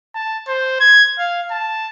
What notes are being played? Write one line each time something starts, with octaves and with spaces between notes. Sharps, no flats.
A5
C5
G#6
F5
A5